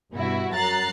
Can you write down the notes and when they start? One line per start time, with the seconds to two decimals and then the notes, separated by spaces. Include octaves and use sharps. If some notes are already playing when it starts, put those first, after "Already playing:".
0.12 G2 B2 E4 F#4
0.52 F#2 F#3 A#5 F#6 A6 C7